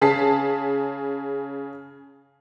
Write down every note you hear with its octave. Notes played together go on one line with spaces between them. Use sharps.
C#3 G#4 A5 B6 C7